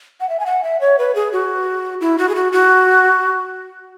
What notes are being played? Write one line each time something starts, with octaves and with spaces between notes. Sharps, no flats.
F#5
E5
G#5
F#5
E5
C#5
B4
G#4
F#4
E4
F#4
G#4
F#4
F#4